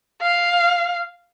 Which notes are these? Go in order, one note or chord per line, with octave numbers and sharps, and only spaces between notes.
F5